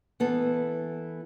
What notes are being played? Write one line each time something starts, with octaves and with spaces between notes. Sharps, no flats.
E3 B3 A4